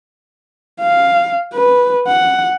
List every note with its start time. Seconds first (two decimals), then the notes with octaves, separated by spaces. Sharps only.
0.81 F5
1.54 B4
2.08 F#5